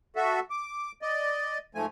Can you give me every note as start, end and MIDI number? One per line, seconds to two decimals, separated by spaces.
0.16 0.40 66
0.16 0.40 69
0.16 0.40 76
0.50 0.92 86
1.02 1.58 74
1.02 1.58 75
1.75 1.86 44
1.75 1.86 53
1.75 1.86 57
1.75 1.86 80